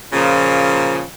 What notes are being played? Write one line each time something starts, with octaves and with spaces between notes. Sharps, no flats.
A#2 C#3 F3